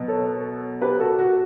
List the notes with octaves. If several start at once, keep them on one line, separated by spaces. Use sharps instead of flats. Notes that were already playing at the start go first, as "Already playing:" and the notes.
Already playing: B2 F#3 B3
A4 C#5
G4 B4
F#4 A4
F#4